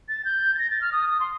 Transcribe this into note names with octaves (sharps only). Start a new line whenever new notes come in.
A6
G6
A6
A#6
A6
F6
D#6
D#6
C6